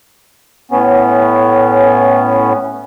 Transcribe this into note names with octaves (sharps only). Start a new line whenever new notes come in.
A2 B3 C#4